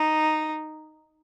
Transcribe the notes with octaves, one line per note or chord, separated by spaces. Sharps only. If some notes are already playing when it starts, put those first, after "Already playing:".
Already playing: D#4